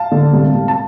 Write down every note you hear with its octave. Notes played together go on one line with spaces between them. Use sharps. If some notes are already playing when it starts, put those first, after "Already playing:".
Already playing: F5 A5
D3
C2
C2
A5